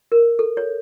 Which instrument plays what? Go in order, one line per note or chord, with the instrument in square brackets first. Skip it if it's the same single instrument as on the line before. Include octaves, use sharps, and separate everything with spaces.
[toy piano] A#4
A4
C#5